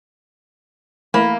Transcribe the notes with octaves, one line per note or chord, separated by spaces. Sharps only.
E3 A3 A#3 B5